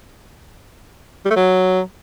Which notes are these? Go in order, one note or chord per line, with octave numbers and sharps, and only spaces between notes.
G3
A3
F#3